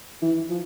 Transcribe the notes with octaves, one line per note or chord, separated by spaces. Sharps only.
E3
F3